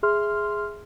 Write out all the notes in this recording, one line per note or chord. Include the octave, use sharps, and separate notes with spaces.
G#4 E5 C6 F6